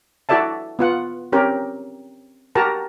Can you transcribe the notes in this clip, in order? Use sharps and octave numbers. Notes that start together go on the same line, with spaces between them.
E4 F#4 A4 D5 E5 A5
B3 F4 F#5
C4 C#4 G4 A#4
F#4 G4 A#4 A5 A#5